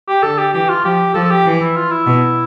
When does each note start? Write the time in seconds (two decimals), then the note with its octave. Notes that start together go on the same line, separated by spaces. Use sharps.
0.08 G4
0.23 D3 A4
0.38 G4
0.54 E3 G4
0.69 F4
0.84 F3 G4
1.14 F3 A4
1.24 A4
1.30 G4
1.45 E3
1.61 E4
1.76 F4
1.91 E4
2.07 B2